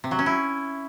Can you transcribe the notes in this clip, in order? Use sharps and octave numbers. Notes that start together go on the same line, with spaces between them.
C3
F#3
C#4
E4